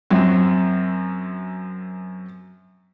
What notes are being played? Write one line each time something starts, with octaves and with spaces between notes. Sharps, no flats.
F#2 F#3 C4